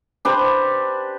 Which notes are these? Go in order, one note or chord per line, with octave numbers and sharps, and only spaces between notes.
D4 G4 B4 C5